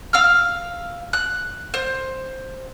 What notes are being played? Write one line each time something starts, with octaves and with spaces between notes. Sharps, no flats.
F5 E6 F6
F#6
C5